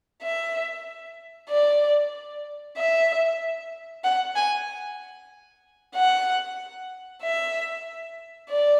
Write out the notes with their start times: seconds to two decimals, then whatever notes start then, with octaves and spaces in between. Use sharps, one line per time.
0.22 E5
1.49 D5
2.77 E5
4.04 F#5
4.36 G#5
5.95 F#5
7.23 E5
8.50 D5